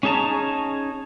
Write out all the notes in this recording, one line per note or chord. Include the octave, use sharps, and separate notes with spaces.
C#4 D#4 G#4 A5 A#5